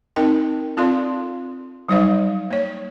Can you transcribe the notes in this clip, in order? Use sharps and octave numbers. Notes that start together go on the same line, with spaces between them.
C4 D#4 A#4 D#5 G5
C4 F4 A4 D5 F5 C6
F#3 G3 D#4 C5 D5 F5
A#3 C#5